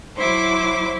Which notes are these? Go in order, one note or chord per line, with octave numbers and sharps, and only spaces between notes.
F#3 E4 C5 D6